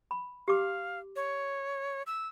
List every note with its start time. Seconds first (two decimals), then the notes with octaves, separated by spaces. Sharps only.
0.11 B5
0.48 G4 F5 D6
1.16 C#5
2.07 E6